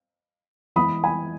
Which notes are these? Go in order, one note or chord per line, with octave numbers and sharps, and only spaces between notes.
E3 G#3 B3 B5 D#6
G#5 B5